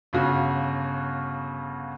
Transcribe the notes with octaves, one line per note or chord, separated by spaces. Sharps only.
G1 C#3 F#4